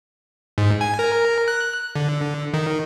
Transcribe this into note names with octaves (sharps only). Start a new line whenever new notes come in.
G#2
G#5
A#4
F#6
D3
D#3